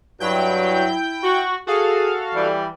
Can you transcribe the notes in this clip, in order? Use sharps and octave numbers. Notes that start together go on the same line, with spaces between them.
G2 F#3 E4 G5 G6
F#4
F#4 G#4 A4 F5
E3 G3